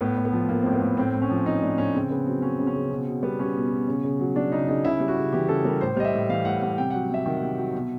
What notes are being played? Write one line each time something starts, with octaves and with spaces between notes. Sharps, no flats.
A2 B3
A2
B3
F3
F3 A#3
A2 C4
B3
A2
A2 C4
A2
C#4
F3
F3 D#4
A2 D4
A2 C#4
C#3 C4
C#3 B3
F#3 C4
F#3 C#4
C#3
C#4
C#3
B2 C4
B2
G3 B3
G3 C#4
B2
B2
C#3
C#3
F#3
F#3 D4
C#3 D#4
C#3 D#4
C#3 E4
G3
F#4
C#3
E3 G4
C#3 A4
G3 A#4
A2 C5
G3 D#5
E5
A2
E3 F5
A2 F#5
G3 F#5
C3 G5
F#3 F#5
C3 E5
D#3
C3
F#3
B2